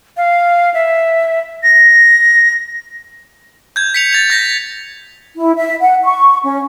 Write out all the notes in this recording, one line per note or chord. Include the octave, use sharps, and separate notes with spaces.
F5
E5
A#6
G6 G#6
B6 C#7 F7
A6 F7
G6 A#6 B6
E4
E5
F#5
C#6
C#4